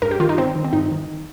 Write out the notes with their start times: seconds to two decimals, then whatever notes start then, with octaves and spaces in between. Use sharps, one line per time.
0.02 G2 A#4
0.11 G4
0.20 D#3 F4
0.29 D#4
0.38 D#3 C4
0.55 D#3
0.64 C4
0.73 G2 D#4
0.92 D#3